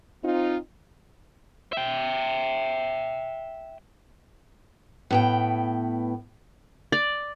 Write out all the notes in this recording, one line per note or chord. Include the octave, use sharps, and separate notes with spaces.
C4 D#4 F4
E5 G5
A2 B3 G5
D5